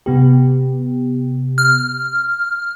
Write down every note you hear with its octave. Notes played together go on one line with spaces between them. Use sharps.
C3 B3 G4
F6